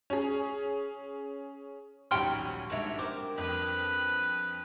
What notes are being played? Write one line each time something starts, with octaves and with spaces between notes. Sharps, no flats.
C#4 G#4
A#1 D#2 F#3 G3 C#4 G5 C6 F6
B1 G#2 D4 C#5 E5 A#5
C4 A#4 D6
F2 B4